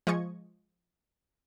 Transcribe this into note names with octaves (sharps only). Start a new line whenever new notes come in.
F3 G#3 D#5 C#6 G#6